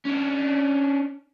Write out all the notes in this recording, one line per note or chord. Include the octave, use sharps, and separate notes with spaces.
C#4 D4